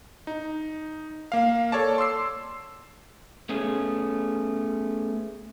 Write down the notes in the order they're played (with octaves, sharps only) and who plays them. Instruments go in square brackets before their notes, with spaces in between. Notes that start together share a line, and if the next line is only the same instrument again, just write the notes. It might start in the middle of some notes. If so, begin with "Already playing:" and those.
[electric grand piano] D#4
A#3 F5
A4 C#5 D5 A5
C6 D6 E6 C7
[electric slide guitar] A3 B3 C#4 G#4